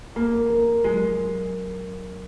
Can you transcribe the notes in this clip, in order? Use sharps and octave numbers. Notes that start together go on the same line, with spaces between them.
A#3 A#4
A#4
A#4
A#4
F#3 G#3